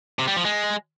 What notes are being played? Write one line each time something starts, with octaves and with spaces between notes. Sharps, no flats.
C3
G3
F3
G#3